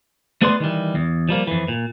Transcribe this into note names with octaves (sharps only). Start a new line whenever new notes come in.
A3 B3 G#4 B4 D5 C6
D#3 E3 G3
E2
F3 G3 A#3
F2 E3
A#2